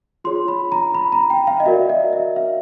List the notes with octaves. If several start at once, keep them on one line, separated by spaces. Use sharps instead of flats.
F4 G#4 C#5 C6
B5
A#5
B5
A#5
G5
F5
D#5
F#4 A#4 D5 E5
D#5
E5
F5